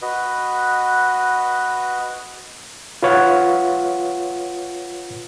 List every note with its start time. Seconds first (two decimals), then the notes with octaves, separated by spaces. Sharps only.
0.02 F#4 B4 D#5
3.03 F4 B4 C#5 F5 F#5